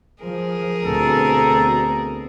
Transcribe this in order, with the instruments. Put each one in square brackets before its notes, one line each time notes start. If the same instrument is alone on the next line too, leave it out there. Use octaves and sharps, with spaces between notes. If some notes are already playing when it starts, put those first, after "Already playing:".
[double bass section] F3 [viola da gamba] G#4 A#4
[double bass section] D2 B2 [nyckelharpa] C4 A#5 [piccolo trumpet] A4